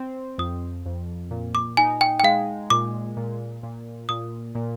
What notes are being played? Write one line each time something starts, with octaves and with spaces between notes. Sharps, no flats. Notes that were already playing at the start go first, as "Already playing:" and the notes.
Already playing: C4
F2 D#6
F2
A#2
D6
D#4 G#5
G5
G5
G#3 F5
A#2 D6
A#2
A#2
A#2 D#6
A#2